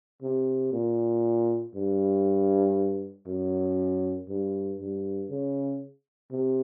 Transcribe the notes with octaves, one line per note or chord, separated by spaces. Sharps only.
C3
A#2
G2
F#2
G2
G2
C#3
C3